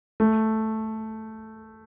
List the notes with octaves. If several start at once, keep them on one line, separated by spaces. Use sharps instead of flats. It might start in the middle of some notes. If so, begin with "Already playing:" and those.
A3